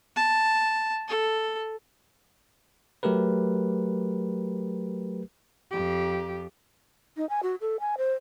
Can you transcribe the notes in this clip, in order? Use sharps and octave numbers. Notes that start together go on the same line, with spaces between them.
A5
A4
F#3 A3 G4 A#4 B4
F2 G4
D#4
G#5
F#4
A4
G#5
C5